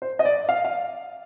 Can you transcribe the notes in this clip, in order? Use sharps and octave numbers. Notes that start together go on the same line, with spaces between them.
C5
D#5
D5
F5
F5